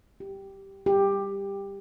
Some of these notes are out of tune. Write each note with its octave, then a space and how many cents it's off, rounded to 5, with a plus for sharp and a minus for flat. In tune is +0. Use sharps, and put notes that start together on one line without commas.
G4 -5
G4 +15